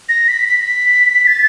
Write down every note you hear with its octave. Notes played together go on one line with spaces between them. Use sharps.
A#6
B6
B6
A6